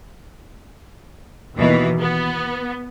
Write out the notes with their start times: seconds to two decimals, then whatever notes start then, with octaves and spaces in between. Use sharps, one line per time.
1.55 D#2 B2 E3
1.99 B3